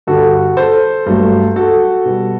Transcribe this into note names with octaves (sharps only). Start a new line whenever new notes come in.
G2 D3 G3 F#4 A4
A4 C5
G2 F#3 A3
F#4 A4
B2 G3